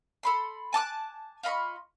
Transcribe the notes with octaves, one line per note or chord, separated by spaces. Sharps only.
A4 B5 C6
G#5 A5 D6 F#6
F4 D#5 B5 C#6